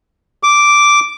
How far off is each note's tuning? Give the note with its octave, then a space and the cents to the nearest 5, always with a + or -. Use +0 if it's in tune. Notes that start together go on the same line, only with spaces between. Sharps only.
D6 -5